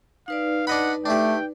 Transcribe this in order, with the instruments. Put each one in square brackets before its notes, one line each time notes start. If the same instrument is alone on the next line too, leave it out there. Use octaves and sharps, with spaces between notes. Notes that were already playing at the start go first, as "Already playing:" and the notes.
[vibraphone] D#4 B4 D5 [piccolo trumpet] F5
[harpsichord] D4 D#5 B5 [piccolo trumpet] F#5
[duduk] A3 [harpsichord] D4 G4 [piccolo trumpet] G5